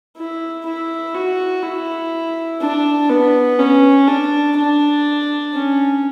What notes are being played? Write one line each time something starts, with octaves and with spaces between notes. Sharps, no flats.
E4
E4
F#4
E4
D4
B3
C#4
D4
D4
C#4